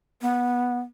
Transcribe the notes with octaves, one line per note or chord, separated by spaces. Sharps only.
B3